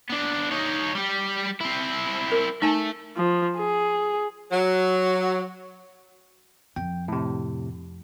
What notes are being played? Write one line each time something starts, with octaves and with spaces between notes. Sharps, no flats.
B3 D4
D#4 C#5
G3 G4
C4 E4
A#4
A3 D#4 G#5 A5
F3
G#4
F#3
F2 G5
A2 C3